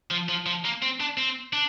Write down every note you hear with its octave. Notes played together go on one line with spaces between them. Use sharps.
F3
F3
F3
A#3
C4
D4
C4
D4